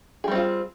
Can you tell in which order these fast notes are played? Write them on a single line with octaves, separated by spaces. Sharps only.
G#4 G3 C4 F4